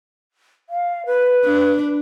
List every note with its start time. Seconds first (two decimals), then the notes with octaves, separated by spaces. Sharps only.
0.69 F5
1.06 B4
1.45 D4